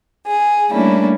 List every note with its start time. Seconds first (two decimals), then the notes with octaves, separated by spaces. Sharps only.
0.25 G#4
0.69 G3 A3 A#3 C#4 D4 E4